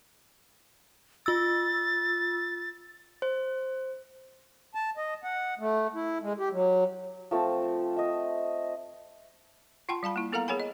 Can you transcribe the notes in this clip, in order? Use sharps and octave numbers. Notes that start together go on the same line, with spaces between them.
F4 E6 A6
C5
A5
D#5
F#5
A3
E4
G#3
G4
F#3
F3 A3 C4 A5
D#5 E5
F4 F#5 G5 A5 C6
G3 F5 A5 B5
A#3 E4
B3 A4 A#4 F5 F#5 A#5
G#4 A#4 C#5 F#5 G#5 B5
D#5